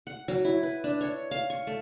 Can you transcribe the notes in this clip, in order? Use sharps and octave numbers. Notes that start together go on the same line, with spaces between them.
F#5
F#3
E4
B4
D4
C#5
F5
C#6
A3